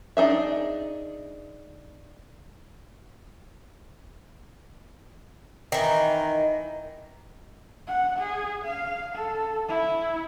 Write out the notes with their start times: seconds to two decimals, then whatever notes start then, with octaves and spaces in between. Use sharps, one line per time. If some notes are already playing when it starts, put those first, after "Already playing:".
0.17 D4 D#4 G#4 E5
5.72 D#3 E3
7.88 F#5
8.19 G#4
8.65 F5
9.15 A4
9.69 E4